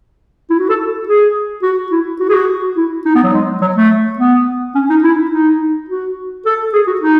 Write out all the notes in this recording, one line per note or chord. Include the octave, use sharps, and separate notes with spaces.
E4
F#4
A4
G#4
F#4
E4
F#4
G#4
F#4
E4
D#4
B3
F#3
G#3
F#3
A3
B3
C#4
D#4
E4
D#4
F#4
A4
G#4
F#4
D#4